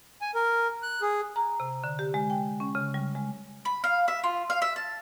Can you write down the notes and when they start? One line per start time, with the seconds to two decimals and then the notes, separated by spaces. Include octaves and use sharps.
0.21 G#5
0.35 A#4
0.83 F#6
1.02 G#4
1.36 A#5
1.60 C3
1.84 D3
1.99 G4
2.14 G#3
2.30 G5
2.60 C#4
2.75 C#3
2.94 G3
3.15 G#3
3.65 B5
3.84 F5
4.08 E5
4.24 F4
4.50 F5
4.62 E5
4.76 A5